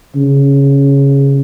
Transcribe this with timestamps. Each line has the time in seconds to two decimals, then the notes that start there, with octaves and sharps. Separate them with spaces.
0.15 C#3